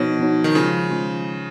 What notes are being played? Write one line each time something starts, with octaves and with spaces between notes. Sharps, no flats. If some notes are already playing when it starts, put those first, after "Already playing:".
Already playing: B2 F3 B3 D#4 F#4 C#5
F3 B3 D#4 F#4 C#5
D#3
C#3 F3 G#3 C#4 F4
F3 G#3 C#4 F4